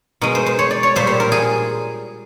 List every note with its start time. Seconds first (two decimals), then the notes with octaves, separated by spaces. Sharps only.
0.21 B2 G#3 A#4
0.35 C5
0.46 C5
0.59 C#5
0.71 D5
0.83 C#5
0.96 A#2 G3 C5
1.07 C5
1.20 A#4
1.32 G#4